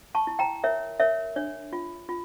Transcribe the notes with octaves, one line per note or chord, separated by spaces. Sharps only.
A5 C#6
E4
G5 A#5
A#4 C#5 E5
A#4 C#5 E5
D4 C#5
F4
F4